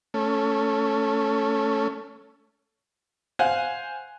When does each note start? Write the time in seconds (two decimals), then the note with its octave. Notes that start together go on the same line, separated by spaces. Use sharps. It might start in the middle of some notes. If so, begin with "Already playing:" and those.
0.14 A3 C#4
3.39 C5 F5 F#5 G#5 F#6